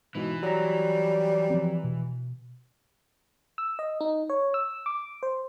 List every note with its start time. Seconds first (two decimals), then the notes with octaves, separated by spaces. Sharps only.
0.15 G#2 B2 E3
0.43 F#3 G3 A#5
1.50 F3 C4
1.84 B2
3.58 E6
3.79 D#5
4.01 D#4
4.30 C#5
4.54 E6
4.86 D6
5.23 C5